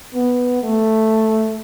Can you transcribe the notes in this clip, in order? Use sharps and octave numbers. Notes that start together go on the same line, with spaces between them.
B3
A3